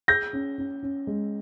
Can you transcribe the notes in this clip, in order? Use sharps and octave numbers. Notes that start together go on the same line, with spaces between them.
G#4 G6 A#6
C#4
C#4
C#4
G#3